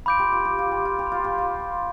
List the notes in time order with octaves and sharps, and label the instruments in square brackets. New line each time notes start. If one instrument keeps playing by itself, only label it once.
[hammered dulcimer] F4 [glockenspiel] B5 D6 G6 D7
[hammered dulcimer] G4
F4
G4
F4
G4
F4
G4
F4
G4
F4